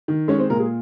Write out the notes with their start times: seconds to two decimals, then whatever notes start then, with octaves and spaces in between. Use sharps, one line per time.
0.08 D#3
0.28 G#3 C#4 C#5
0.39 C4 C5
0.50 A#2 A#4
0.60 G#4